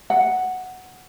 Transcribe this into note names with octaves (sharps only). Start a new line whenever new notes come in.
F#5